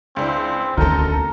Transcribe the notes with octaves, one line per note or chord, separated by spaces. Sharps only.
C#2 C4 D4 E4
D2 C4 C#4 D#4 A4 A#4